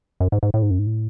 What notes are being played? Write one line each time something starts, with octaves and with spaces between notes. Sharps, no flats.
F#2
G#2
G#2
A2
G#2
F#2
G#2
A2